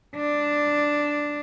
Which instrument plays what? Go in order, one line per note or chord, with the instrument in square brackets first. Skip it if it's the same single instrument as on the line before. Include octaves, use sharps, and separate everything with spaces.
[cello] D4